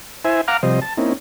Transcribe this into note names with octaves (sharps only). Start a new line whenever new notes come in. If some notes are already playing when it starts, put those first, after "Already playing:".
E4 C5 E5 G#5
F5 F#5 A#5 D6 F6
C3 F3 G3 C5 D#5
A5
A#3 C4 C#4 D#4 E4